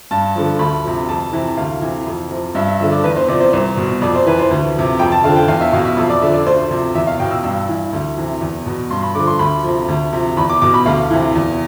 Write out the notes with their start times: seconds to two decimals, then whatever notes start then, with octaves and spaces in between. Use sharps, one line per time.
0.11 G2 A5
0.35 D3 F3
0.59 D2 B5
0.84 C3 F3
1.09 F2 A5
1.33 C3 E3
1.57 D2 F5
1.81 C3 E3
2.06 F2
2.31 C3 F3
2.55 G2 E5
2.67 E5
2.79 F3 E5
2.82 D3
2.92 D5
3.04 E2 B4
3.16 C5
3.28 C3 F3 D5
3.40 C5
3.53 C2 C5
3.77 B2
4.01 F2 D5
4.15 C5
4.26 E3 B4
4.39 C5
4.51 D2
4.75 C3 F3
4.99 F2 G5
5.12 A5
5.24 D3 F5
5.28 F3
5.36 G5
5.48 E2 F5
5.61 E5
5.73 B2 F5
5.85 E5
5.97 F2 E5
6.09 D5
6.21 D3 F3 E5
6.33 D5
6.46 D2 C5
6.71 C3 F3
6.95 E2 E5
7.07 F5
7.19 B2 G5
7.31 E6
7.44 G2 E6
7.69 E3
7.93 D2
8.17 C3 E3
8.41 E2
8.66 B2
8.91 G2 C6
9.03 B5
9.15 D3 D6
9.19 F3
9.27 C6
9.39 D2 B5
9.64 C3 F3
9.88 D2
10.13 C3 F3
10.37 E2 B5
10.49 D6
10.62 B2 D6
10.74 B5
10.86 D2 F5
11.10 C3 E3
11.35 E2